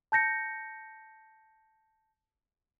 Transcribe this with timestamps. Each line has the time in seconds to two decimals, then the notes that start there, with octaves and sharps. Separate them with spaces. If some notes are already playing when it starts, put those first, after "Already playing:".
0.12 A5 G6 A#6 C#7